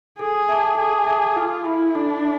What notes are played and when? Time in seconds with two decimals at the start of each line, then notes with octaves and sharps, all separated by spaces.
0.19 G#4 A4
0.49 E5 A5 D6
0.77 G#4 A4
1.07 E5 A5 D6
1.36 F4 A4
1.65 E4 E5 B5
1.95 D4 A4
2.23 E5